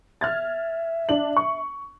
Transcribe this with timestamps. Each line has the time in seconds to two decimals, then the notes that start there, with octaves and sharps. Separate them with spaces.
0.21 E5 F6 G#6 A6
1.09 D4 F#7
1.37 C#6